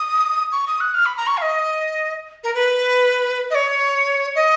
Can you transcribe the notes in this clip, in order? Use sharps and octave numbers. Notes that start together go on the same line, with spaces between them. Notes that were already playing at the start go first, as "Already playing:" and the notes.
Already playing: D#6
C#6
D#6
F#6
F6
B5
A#5
C#6
F5
D#5
A#4
B4
D#5
C#5
D#5